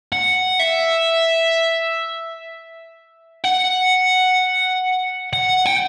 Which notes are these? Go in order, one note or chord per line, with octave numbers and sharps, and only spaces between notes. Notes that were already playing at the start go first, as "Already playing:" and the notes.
F#5
E5
F#5
F#5
G5